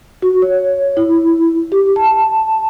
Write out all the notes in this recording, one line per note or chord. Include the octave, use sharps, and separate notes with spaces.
F#4
C#5
E4
G4
A5